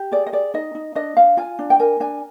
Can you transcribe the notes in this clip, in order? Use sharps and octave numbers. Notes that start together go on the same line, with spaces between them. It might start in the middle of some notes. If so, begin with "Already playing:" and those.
Already playing: G4
G#4 D5
D#5
G#4 D5
D#4 D#5
D#4
D4 D#5
D4 F5
F4 G#5
D4
G5
A#4 G#5
D4 G#5